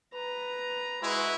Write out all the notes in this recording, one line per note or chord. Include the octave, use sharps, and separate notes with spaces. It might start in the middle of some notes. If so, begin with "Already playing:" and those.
B4 A#5
G#3 E4 F#4 B4